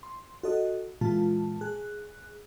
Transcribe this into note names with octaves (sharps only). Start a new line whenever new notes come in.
C6
F#4 A4 D#5
A#2 E3 G#3 F4 A5
G#4 F#6